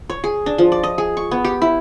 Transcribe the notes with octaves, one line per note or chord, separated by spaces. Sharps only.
C#5
G#4
D4
F3
D5
D#5
G#4
C#6
B3
G4
E4